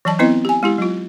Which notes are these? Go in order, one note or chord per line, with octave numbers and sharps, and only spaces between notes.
E3 F#3 D5 A5
B3 C4 E4 B4 D#5
G4 G#5
G#3 E4 G4
F#3 F4